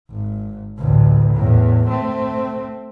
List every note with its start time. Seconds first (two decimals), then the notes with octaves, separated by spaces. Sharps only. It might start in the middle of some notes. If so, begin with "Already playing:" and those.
0.10 G#1
0.77 A1 D2
1.34 E2 A2
1.89 A3 C4